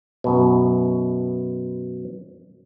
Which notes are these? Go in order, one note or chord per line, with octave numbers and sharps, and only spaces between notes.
F#2 B2